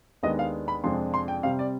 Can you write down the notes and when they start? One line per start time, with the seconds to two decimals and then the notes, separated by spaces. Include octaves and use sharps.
0.23 D#2 D#3 G#3 B3 D4 D#5
0.39 F5
0.68 B5
0.83 F2 C3 F3 G#3 D4 C6
1.14 C6
1.28 G5
1.43 C3 G3 C4 F5
1.59 D5